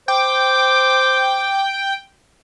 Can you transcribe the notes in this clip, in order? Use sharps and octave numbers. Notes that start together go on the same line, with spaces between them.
C5 G5 D6